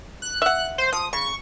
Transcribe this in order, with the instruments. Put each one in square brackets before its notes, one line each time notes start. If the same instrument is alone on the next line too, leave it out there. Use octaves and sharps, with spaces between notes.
[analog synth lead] F#6
[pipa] E5 F#5
[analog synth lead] C5
[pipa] F3 [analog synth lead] D#6
[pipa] C#3 [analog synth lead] C#6